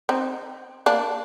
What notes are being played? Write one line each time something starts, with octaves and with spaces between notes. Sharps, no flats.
C4 D#4
A#3 D4